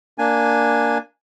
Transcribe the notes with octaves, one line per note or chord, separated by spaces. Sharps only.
A#3 D4 G#5